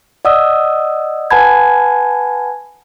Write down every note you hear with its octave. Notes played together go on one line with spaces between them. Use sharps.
D5 D#5 F#5 D#6 E6
B4 F#5 G#5 A5 B5 G#6